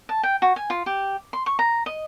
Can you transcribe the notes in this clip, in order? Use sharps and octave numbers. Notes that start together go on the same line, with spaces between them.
A5
G5
F#4
G#5
F4
G4
C6
C#6
A#5
D#5